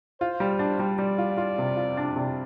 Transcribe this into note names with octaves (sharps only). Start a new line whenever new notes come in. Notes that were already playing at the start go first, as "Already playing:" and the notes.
F4 C5
G3
D4
G3
G3 D5
F4
F4
C3
F4
D4
C3